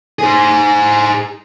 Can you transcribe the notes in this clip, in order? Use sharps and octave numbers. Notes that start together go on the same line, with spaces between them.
G#4 C5